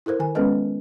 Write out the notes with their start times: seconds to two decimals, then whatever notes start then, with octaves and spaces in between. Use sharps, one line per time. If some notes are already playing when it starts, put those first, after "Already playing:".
0.06 E4 A4 A#4 C5
0.19 D#3 G#5
0.35 G#3 B3 C#4 A4 B4 D#5